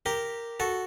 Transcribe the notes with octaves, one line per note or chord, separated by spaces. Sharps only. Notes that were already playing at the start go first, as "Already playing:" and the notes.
G4 A#4
F#4 A4